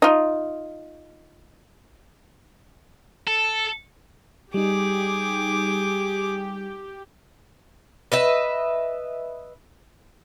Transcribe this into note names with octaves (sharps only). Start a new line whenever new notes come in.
D#4 F4
A4
G3 D#4 G4 G#4 D6
B4 D#5 E5